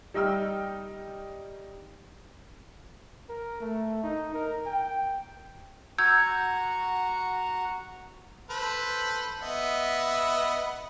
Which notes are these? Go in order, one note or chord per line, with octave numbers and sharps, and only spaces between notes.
G3 D#4 G5 E6 F6
A#4
A3
D#4
A#4
G5
F#4 F#5 A#5 E6 G6 G#6
A4 B4 C5
B3 D#5 E5